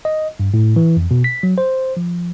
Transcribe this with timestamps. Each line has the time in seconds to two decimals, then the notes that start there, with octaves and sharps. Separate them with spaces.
0.05 D#5
0.40 G2
0.54 A2
0.76 E3
0.97 F2
1.11 B2
1.24 B6
1.43 F#3
1.58 C5
1.97 F3